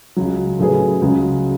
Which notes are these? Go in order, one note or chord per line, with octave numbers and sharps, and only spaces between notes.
C#2 C#3 F#3
A2 F#3 C#4 G#4 B4
C#2 C#3 F#3